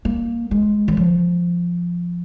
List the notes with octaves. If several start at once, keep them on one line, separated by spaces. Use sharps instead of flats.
A#3
G#3
D#3
F3